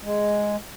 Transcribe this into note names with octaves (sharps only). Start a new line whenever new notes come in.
G#3